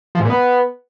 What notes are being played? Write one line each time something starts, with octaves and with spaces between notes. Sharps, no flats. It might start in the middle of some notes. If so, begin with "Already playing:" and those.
F3
G#2
A#2
B3